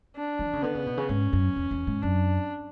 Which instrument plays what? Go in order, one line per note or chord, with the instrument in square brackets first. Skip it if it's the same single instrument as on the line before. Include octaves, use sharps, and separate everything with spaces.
[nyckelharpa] D4
[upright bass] E3
C#3
[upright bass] D3 [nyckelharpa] B3
[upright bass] C#3
B2
C#3
[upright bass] G#2 [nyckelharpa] C#4
[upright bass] F#2
E2
E2
G#2
[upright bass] F#2 [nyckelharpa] D4